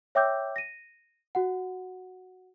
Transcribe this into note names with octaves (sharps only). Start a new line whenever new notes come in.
C#5 E5 G5 D6 E6 G6
A#6 D#7
F#4 F#5